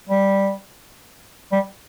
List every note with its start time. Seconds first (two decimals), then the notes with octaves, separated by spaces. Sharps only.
0.09 G3
1.52 G3